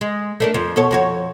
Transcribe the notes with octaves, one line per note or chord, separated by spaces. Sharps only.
G#3
A3 D4 A#4
F2 F3
B2 A4 C#5
F2 F#4 C#5